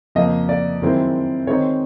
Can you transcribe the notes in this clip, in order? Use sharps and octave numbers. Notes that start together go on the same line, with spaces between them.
F2 C#3 F3 A#3 D#5
D5
F#2 D#3 G#3 C4 E4
D#3 G#3 C4 D#4 C#5